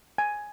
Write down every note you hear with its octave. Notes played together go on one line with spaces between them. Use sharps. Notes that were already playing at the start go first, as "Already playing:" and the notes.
G#5